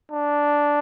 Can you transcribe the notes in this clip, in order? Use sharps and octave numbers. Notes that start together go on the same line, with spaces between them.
D4